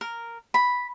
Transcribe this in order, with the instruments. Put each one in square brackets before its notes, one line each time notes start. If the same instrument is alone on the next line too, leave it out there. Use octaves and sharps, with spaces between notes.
[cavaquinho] A#4
B5